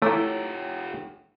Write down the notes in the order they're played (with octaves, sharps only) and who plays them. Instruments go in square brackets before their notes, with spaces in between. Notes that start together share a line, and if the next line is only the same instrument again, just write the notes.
[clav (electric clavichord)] A3 E4 [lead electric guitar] F4 G4 [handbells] C#5 A#5 D6